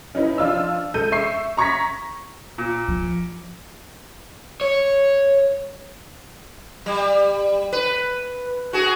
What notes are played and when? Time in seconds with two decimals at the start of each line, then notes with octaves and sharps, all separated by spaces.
0.15 C#4 D#4 E4 B4
0.38 F3 D4 F4 D5 E6
0.94 G#3 A4 G6 D#7
1.12 E5 C#6 C7
1.57 A#5 C#6 G#6 A#6 B6
2.58 A#2
2.88 F3
4.61 C#5
6.86 G3
7.73 B4
8.73 F#4 G#4